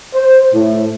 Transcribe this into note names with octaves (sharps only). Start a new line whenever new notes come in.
C5
A2